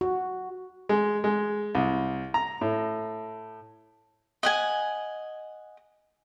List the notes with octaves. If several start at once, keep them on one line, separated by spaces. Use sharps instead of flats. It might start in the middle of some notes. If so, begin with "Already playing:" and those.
F#4
G#3
G#3
C2
A#5
A2
D#5 F#5 G#5